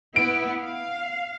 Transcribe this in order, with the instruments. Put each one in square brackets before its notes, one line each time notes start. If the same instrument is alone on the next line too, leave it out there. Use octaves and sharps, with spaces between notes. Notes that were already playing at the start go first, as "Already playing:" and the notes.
[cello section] B3 E4 [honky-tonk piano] D7
[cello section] F5